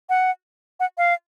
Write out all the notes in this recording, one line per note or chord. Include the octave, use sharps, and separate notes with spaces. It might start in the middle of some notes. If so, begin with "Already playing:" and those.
F#5
F#5
F5